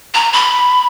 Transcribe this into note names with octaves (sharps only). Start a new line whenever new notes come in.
A#5
B5